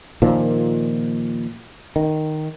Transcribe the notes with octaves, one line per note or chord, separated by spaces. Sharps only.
A#2 D#3 F3
D#3